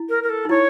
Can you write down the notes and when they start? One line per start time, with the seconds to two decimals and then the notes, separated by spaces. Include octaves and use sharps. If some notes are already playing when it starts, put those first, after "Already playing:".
Already playing: E4
0.09 A#4
0.23 A#4
0.29 A4
0.45 D#4
0.49 E4 C#5